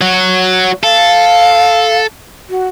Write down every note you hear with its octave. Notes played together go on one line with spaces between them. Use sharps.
F#3 F#4
A4 F5
F#4